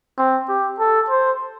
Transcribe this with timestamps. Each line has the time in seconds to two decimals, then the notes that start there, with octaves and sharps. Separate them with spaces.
0.18 C4
0.49 G4
0.79 A4
1.10 C5